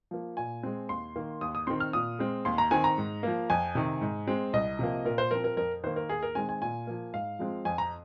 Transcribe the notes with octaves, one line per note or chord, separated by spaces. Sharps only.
F3 A#3
A#2 G#5
G#3 C4
D#2 C6
D#3 A#3
D#2 D#6
D#6
D#3 C4 C6
F6
A#2 D#6
G#3 C4
D#2 C6
A#5
D#3 C4 G#5
A#5
G#2
F3 A#3
F2 G#5
C3 D#3
G#2
G#3 C4
C2 D#5
C3 F3 A#3
A#2 A#4
C5
F3 C4 A#4
A#4
F2 A#4
D#3 A#3 C5
A#4
D#2 G#4
A#4
D#3 G#3 C4 G#5
G#5
A#2 G#5
F3 A#3
G#2 F5
F3 G#3 C4
F2 G#5
A#5